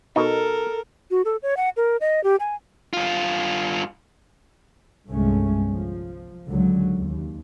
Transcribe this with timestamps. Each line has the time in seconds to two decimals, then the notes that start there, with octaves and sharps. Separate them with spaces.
0.16 B2 D#4 A4 A#4
1.11 F#4
1.25 A4
1.43 C#5
1.57 F#5
1.77 A#4
2.01 D#5
2.24 G4
2.40 G#5
2.93 G2 F4
5.09 G1 C2 G2 G#3 A3 C#4
5.68 F3
6.48 C#2 D3 F#3
6.97 D#2